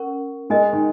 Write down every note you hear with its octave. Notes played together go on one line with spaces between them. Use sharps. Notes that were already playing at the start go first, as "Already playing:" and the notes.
Already playing: C#4 A#4 C#6
G#3 A#4 D#5 G#5
D#3